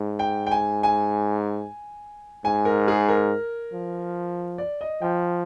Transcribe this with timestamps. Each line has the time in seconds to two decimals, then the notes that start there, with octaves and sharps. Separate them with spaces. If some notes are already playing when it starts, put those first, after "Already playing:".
Already playing: G#2
0.19 G5
0.47 G5
0.51 G#5
0.83 G#5
2.44 G#2 G#5
2.65 A#4
2.88 G#4
3.09 A#4
3.73 F3
4.58 D5
4.81 D#5
5.02 F3 G5